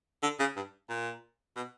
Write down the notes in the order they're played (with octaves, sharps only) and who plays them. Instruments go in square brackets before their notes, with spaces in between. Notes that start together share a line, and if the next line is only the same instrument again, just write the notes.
[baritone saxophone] D3
C#3
G2
A#2
B2